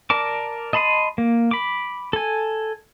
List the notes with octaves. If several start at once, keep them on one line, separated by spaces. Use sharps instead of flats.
A#4 D5 A5 D6
D#5 A5 B5 C6 D#6
A#3
B5 D6
A4 G#5